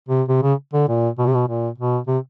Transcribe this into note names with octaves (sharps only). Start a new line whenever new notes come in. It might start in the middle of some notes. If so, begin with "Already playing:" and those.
C3
C3
C#3
D3
A#2
B2
C3
B2
A#2
B2
C3